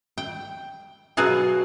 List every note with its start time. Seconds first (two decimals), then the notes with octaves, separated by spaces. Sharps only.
0.18 G5
1.17 B2 F#3 F#4 G#4 F5